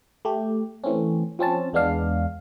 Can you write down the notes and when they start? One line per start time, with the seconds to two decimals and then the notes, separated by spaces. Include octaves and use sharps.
0.25 A3 G4
0.84 E3 A3 C4 C#4
1.39 F3 C4 C#4 A5
1.73 E2 G#3 B3 D4 F5